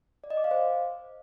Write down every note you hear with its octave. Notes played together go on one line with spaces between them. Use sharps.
D5
D#5
D6
F5
C5